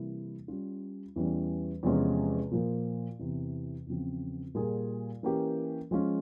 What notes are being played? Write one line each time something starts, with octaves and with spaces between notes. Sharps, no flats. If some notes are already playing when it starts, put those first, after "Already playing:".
Already playing: C3 E3 G3 A#3 E4
G3 C#4 F4
E2 E3 G3 C#4
E2 C3 F3 G#3 C#4
A#2 F3 A#3
E2 C3 E3
E2 C#3 F3 C4
A#2 G3 A#3 F4 G#4
E3 A#3 C#4 G4 A#4
F3 G#3 C#4 F4